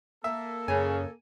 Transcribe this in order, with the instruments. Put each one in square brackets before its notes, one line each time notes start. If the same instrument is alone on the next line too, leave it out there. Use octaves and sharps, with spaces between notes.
[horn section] A#3 A4 [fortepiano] E5
[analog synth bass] F#2 [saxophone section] C#3 [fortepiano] G#5